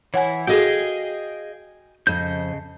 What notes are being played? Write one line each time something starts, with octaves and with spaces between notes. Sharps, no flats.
E3 E4 C#5 F#5 G#5
F#4 G#4 A4 D#5 F5 G5 G#5
F2 C#3 D#5 G6